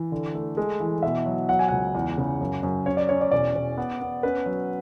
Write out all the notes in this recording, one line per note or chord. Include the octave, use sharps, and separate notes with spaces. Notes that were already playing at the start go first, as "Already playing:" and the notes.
Already playing: E3
D3
A3
G#3
E3
B2 E5
F#3
F#3 F#5
G#5
C#2 F#5
E2
C#3
F#2
F#2
C#4 C#5
D5
C#4 C#5
D5
E1 D5
E1
B3
B3
C#4 B4
F#3